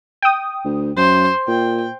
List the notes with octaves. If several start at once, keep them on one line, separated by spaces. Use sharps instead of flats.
G5 D#6
D2
F#2 C5
A#2 G5